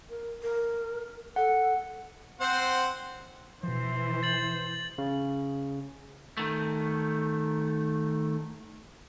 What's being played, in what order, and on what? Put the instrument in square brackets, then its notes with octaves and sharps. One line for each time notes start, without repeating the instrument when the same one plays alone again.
[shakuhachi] A#4
A#4
[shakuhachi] A4 [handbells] F#5
[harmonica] C4 C5 F#5
[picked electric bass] B2 F3 [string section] E3 [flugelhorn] C5
[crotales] A6 F#7
[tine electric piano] C#3
[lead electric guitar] D#3 A3